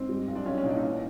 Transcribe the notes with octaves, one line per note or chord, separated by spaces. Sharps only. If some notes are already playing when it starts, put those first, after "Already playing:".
Already playing: G#2 C4
G3
B1
D4
B1 C#4
C#4
A#2 D#4
D4
D#4
E3 D4